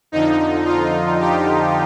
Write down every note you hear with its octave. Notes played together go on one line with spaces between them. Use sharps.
F2 D3 F3 D#4
F4
G4